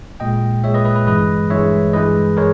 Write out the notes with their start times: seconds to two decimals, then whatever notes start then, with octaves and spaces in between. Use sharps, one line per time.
0.20 A#2 G#3 D#5 G5
0.64 A#2 G#3 C#5 E5
0.74 B4 D#5
0.85 B4 D#5
0.96 B4
1.07 G2 E3 G#3 B4 D#5
1.50 G2 E3 G#3 C#5 E5
1.93 G2 E3 G#3 B4 D#5
2.37 G#3 A#4 C#5